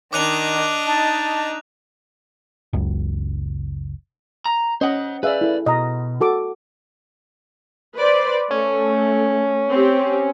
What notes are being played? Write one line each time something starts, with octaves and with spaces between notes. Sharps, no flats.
D#3 D4 D#5 D6 F#6 F7
D#4 A5
F#1 C#2
A#5
C#4 C5 D#5 F#5
G#4 B4 D5 E5 F5
E4 A4
B2 D#5 A#5
F#4 A4 D6
B4 C5 D5
A3 C#4
C4 G4